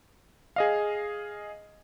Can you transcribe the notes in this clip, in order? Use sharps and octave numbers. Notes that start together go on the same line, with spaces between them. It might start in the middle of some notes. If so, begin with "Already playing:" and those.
G#4 D#5 F5